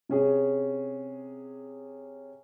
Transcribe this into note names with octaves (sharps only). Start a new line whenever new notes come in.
C3 C#4 G#4